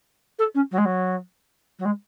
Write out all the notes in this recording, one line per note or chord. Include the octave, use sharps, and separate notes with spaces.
A4
C#4
F#3
G#3
F#3
F#3
G#3